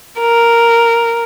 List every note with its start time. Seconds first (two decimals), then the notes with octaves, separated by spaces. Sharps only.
0.20 A#4